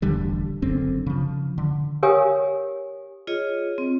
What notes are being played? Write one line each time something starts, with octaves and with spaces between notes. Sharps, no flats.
E1 A1 D3 G3
F#1 F#2 D3 C4
C#3 F3
D3
G4 A#4 C#5 F5 G#5 D#6
F4 G#4 C#5 D#5
C4